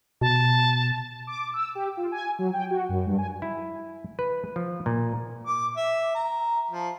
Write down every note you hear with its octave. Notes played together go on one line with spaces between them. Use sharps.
B2 A5
D6
E6
G4
F4
G#5
F#3
G5
F#4
F#2
G2
G#5
E4
B4
F3
A#2
D6
E5
A#5
F3